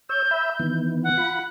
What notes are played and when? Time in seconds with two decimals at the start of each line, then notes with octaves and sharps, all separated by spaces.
0.09 C#5 E6 G6
0.31 E5 B5 E6
0.60 D#3 E3 B3
1.04 F#5
1.18 F4 B5